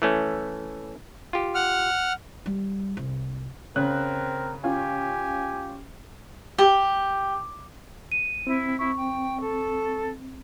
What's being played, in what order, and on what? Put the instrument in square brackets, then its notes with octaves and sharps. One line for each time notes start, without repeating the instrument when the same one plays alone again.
[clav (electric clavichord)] E3 A3 C#4
F4 G4
[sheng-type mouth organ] F#5 F6
[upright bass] G3
C2
[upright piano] C#3 [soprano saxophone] C4 [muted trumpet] A#4 [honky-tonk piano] F#6
[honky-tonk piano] C#4 F4 [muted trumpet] G4 [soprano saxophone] G#5
[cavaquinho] G4
[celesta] D#7
[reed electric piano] C4 [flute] E4
[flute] E4 [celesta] C#6
[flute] G5
A4